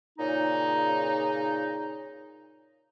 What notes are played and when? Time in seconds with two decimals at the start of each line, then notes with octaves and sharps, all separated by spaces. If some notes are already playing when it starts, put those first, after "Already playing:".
0.19 A#2 C#3 D#4